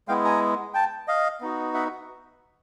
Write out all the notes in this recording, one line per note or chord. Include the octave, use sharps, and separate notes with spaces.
G#3 B3 E4 F5 G5
G#5 A#5
G5 A5
D#5 F5
B3 D#4 F#4
E5 F#5